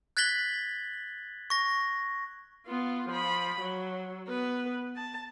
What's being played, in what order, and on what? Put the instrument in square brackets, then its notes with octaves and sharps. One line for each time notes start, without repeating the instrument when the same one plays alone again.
[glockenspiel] F#6 G#6 A6 B6 F#7 G7
C#6 A#6
[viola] B3 F4
F3 B5
F#3
B3 B4
A5